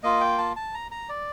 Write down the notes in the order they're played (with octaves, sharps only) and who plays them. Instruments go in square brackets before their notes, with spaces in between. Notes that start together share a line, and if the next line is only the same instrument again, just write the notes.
[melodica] A#3 F4 D#5
G5
A5
A5
A#5
A#5
D5